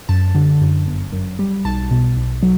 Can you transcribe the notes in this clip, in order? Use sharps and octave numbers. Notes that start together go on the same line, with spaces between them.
F#2 A5
D3
F#2
G1
F#2
G3
B1 A5
B2
B1
F#3